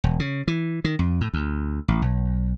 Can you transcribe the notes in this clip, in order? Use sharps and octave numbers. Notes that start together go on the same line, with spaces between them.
E1
C#3
E3
D#3
F2
A2
D2
A1
B1